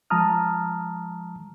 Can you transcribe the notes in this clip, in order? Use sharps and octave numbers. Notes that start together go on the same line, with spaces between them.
F3 G#3 A5 A#5 D#6 F6